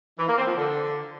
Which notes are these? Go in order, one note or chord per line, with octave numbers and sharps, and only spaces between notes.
E3
A#3
C4
F3
D3